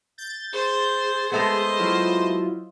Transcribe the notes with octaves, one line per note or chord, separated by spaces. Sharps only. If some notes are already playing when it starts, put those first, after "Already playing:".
G6 A6
G#4 C5
G#3 A3 B3 C5 D#5
F#3 E4 F4